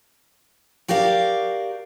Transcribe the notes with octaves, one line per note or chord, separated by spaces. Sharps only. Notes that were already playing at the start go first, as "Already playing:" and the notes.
F#4 G4 A#4 D5 F5